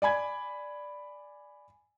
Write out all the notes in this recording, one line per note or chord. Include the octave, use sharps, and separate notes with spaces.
D5 G#5 B5 G#6